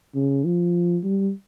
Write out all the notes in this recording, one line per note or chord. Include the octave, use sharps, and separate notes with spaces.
C#3
F3
G3